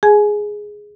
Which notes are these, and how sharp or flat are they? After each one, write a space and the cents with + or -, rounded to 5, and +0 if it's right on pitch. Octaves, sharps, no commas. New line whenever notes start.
G#4 +0 G#5 +20